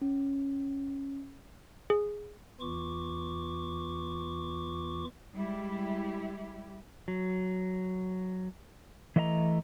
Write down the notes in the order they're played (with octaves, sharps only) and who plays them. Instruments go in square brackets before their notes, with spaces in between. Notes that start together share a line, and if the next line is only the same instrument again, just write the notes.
[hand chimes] C#4
[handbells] G#4
[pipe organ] E2 E3 F4 C#6 D6
[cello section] G3 G#3 E4 G4
[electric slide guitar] F#3
E3 A3 D#5 E5 A#5